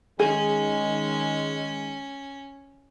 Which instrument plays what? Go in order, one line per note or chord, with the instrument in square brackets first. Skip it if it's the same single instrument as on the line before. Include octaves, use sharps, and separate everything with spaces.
[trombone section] D#3 G#3 [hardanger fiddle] C#4 [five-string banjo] G#4